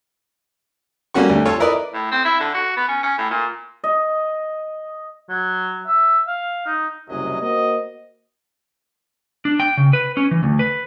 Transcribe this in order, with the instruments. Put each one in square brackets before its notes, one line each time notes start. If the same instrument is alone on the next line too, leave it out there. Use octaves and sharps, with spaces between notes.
[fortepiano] G3 A3 A#3 C#4 F#4 C#6
D2
F4 A4 C#5
E4 A#4 B4 D5 D#5
[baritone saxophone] A2
C4
E4
D3
F#4
B3
C#4
C#4
A2
A#2
[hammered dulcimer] D#5
[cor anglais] F#3
E5
F5
D#4
[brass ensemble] F#1 C2 F#2 C3 F#3 D#5
A#3 F#4 C5 D#5
[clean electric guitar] D4
G5
C#3
B4
C#4
E3
D2
B4